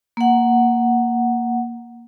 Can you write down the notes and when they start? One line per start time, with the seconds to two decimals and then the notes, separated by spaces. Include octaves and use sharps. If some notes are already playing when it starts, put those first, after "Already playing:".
0.17 A#3 F#5